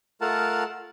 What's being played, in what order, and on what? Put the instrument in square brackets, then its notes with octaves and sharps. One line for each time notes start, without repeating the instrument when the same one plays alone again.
[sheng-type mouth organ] A3 F4 A#4 F#5 A5